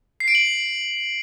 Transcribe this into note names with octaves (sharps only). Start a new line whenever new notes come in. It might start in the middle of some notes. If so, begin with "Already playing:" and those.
C7
D7
F#7